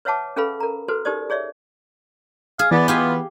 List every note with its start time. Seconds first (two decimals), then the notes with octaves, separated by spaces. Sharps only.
0.05 B4 C#5 E5 F#5 A5 D6
0.36 C#4 G#4 A4 B4 F5 B5
0.60 A#4 A#5
0.88 F#4 A4 B4 C5
1.05 D#4 G4 A#4 C5 D5 D#6
1.30 G#4 C#5 D5 E5
2.59 G#4 F5
2.71 E3 B3 D5
2.88 F4 G4 F5 G#5